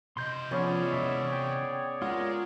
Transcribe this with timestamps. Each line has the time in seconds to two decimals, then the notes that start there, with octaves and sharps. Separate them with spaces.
0.17 C3 D#5 C6 G6
0.51 F3 B3 C#4 G#4 C#5 D5
0.93 E3 G#3 E5
1.32 G5
2.02 G#3 F4 A#4 F#5